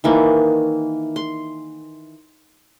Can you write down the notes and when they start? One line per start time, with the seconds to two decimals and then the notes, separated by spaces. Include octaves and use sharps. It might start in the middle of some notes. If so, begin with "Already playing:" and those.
0.04 D#3 E3 A#3
1.16 C6